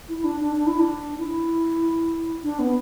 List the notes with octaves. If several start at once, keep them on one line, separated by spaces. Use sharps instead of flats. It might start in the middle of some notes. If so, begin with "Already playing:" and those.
E4
D4
D4
D4
E4
D4
E4
D4
B3